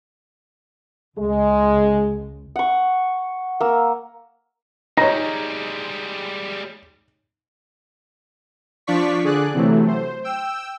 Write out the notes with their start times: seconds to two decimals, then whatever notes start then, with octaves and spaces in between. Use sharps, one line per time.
1.18 C#2 G#3
2.56 F#5 C#6
3.60 A#3 E6
4.98 G3 G#3 D#4 C#5 A#5 A#6
8.87 F3 D4 F4 D5 C#6 B6
9.24 D3 G#4 D5 F#6
9.54 C3 E3 F#3 A3
9.88 C5
10.24 G5 E6